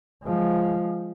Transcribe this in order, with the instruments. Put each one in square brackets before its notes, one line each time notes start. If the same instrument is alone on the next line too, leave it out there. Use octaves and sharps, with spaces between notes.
[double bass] F3 G#3